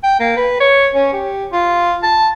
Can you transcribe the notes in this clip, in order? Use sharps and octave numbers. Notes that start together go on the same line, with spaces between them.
G5
A#3
B4
C#5
C#4
G4
F4
A5